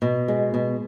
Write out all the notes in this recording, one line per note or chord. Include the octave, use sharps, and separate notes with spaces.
B2
G#3
B2